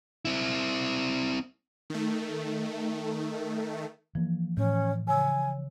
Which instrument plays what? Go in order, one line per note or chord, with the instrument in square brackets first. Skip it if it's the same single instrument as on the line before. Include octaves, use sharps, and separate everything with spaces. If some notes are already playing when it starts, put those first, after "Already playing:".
[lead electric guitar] C4 E4
[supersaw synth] D#3 A3
[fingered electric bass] E3 A#3 [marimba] F3
[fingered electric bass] A2 [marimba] E3 [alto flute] C#4
[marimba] C#3 C#5 E6 [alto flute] G#5